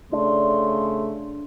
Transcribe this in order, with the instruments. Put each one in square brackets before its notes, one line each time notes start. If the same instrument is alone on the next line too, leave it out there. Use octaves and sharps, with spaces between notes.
[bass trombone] C#3 [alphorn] A3 [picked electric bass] D4 [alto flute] C6